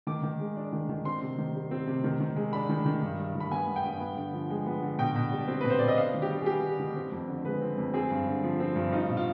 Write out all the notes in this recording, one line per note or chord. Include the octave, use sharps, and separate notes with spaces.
D#3 D6
D#3
G#3
D4
D#3
D#3
C4 C6
C3
D#3
G3
C4
C3
D#3
D#3
G#3
D4 B5
D#3
D#3
G2
G2
D#3
B5
B3 G#5
G2
G5
G2
B3
D3
F3
G#3
B3
D3
B2 G5
B2
G3
C4
B2 B4
C5
B2 D5
D#5
D4 F5
D#3
G4
G3
G#4
B3 G4
D4
D#3
C4
F2
D3
G#3 B4
C4
F2
C4 G#4
G2
D3
F3
C4
G2
D#4 F4
B2
F4